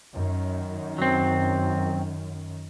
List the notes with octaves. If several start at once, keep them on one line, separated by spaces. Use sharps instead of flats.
F#2 D#3
F#3 C4